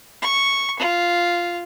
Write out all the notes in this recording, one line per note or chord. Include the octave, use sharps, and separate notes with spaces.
C#6
F4